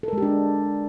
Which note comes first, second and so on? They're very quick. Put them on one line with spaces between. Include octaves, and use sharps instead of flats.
A4 A#4 G#3 G4 D4